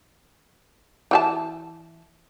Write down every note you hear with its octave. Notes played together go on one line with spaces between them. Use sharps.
E3 F#4 A5